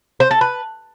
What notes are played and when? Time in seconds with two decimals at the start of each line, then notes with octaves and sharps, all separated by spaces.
0.20 C5
0.31 A4
0.41 B4